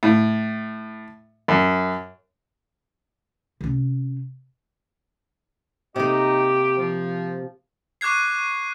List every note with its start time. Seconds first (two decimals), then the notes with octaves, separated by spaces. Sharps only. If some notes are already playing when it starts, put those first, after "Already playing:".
0.03 A2
1.48 F#2
3.61 C3 C#4
5.96 C3 A#3 D#4 G4 D#5
6.77 F3
8.01 C#6 D6 F#6 G#6 C7